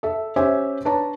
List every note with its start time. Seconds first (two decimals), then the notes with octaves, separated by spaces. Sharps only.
0.03 A4 E5
0.36 C#4 G4 C5 E5 G#5
0.85 D4 B4 C#5 A5 A#5